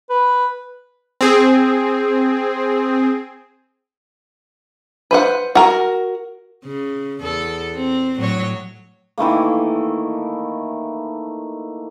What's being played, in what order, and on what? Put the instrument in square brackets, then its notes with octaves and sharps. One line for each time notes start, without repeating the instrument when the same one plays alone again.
[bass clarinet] B4
[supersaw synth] C4 G#4
[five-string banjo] B4 C5 F#5
F#4 A#4
[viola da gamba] C#3
E2 A4
C4
A2 F#3 C#5
[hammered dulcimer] D#3 E3 A3 A#3